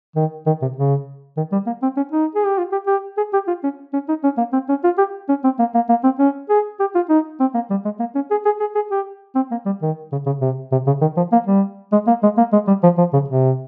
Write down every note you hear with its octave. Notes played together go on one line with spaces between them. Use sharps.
D#3
D#3
C3
C#3
D#3
G3
A#3
C4
C#4
D#4
G#4
G4
F4
G4
G4
G#4
G4
F4
C#4
C#4
D#4
C#4
A#3
C4
C#4
F4
G4
C#4
C4
A#3
A#3
A#3
C4
C#4
G#4
G4
F4
D#4
C4
A#3
G3
G#3
A#3
C#4
G#4
G#4
G#4
G#4
G4
C4
A#3
G3
D#3
C#3
C#3
C3
C3
C#3
D#3
F3
A#3
G3
G#3
A#3
G#3
A#3
G#3
G3
F3
F3
C#3
C3